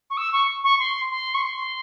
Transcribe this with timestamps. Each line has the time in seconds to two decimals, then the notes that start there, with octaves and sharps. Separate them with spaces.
0.10 C#6
0.17 E6
0.32 C#6
0.63 C#6
0.79 C6
1.11 C6
1.34 C#6
1.42 C6